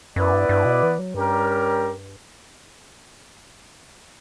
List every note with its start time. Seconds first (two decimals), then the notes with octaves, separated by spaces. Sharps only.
0.16 F#2 B3 E4 B4 D5
0.33 G2
0.49 G2
0.65 B2
0.83 E3
0.99 F#3
1.14 G2 G3 C#4 G4 A#4